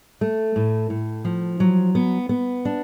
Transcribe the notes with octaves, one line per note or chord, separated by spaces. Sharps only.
A3
A2
A2
F3
F#3
B3
B3
D4